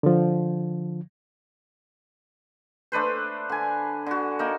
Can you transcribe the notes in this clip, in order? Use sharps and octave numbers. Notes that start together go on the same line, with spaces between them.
D3 F3
A3 D4 B4 C5
D3 G#5
D3 F#4
A#3 D#4